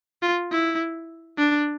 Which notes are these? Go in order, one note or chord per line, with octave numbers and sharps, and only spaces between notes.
F4
E4
D4